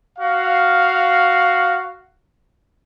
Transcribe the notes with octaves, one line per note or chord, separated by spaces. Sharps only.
F#4 F5